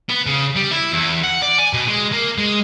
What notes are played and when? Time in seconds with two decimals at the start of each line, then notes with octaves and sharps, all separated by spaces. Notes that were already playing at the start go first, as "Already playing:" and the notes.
0.09 B3
0.26 C#3
0.56 G3
0.71 E4
0.93 E2
1.24 F#5
1.42 D5
1.58 G#5
1.73 B2
1.88 G#3
2.12 A#3
2.38 G#3